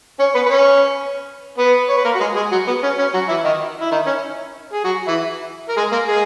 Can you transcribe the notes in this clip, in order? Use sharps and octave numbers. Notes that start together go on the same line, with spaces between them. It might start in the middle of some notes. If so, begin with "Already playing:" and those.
C#4 C#5
B3 B4
B4
C#4 C#5
B3 B4
C#5
B4
A#3 A#4
F#4
G#3 G#4
G#3 G#4
F#3 F#4
B3
C#4
C#4
F#3 F#4
E3 E4
D#3 D#4
E4
D#3 D#4
C#4
G#4
F#3 F#4
E3 E4
A#4
G#3 G#4
A#3 A#4
G#3 G#4